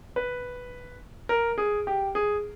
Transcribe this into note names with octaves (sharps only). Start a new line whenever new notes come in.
B4
A#4
G#4
G4
G#4